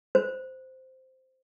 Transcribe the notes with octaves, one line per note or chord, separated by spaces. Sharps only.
C5